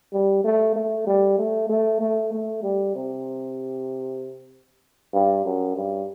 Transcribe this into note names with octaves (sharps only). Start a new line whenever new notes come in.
G3
A3
A3
G3
A3
A3
A3
A3
G3
C3
G2
F#2
G2